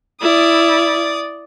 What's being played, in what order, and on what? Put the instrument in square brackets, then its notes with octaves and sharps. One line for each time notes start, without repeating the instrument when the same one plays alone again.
[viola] E4 [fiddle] D5 D#6